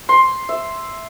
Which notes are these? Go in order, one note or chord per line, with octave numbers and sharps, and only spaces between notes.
C6
E5